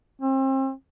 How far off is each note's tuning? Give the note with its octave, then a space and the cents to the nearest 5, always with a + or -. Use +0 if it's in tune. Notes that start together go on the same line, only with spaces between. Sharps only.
C4 +35